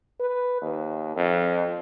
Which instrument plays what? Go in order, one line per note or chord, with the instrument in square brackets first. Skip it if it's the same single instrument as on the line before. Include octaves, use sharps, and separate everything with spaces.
[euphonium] B4
D#2
F2